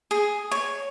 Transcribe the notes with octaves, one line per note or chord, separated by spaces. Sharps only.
G#4
C#5